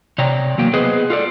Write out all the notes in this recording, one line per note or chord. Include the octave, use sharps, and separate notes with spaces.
C3 C#5 D5 G5 A#5
E2 F#3 A#3 G5
B3 G#4 B4 C5 D#5
F4 A4 D5